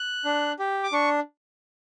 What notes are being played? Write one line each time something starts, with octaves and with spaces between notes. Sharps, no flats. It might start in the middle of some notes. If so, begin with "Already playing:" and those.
Already playing: F#6
D4
G4
D6
D4 C#6